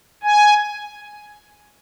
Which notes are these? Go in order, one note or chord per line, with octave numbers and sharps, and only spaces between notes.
G#5